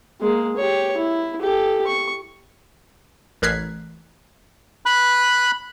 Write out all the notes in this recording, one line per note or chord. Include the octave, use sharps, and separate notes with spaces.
G#3 A#3
G4 C#5
E4
G4 A4
C#6
A1 A#4 F#6 G#6 B6 C7
B5 F#6